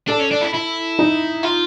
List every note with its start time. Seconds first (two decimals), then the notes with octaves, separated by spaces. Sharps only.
0.07 D4 A4
0.19 C#4
0.31 D4
0.41 E4
0.54 E4
0.99 D#4
1.44 F4